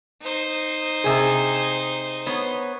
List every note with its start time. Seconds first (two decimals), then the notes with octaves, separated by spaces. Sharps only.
0.22 D#4 C5
1.04 C3 G#4
2.27 B3 C#5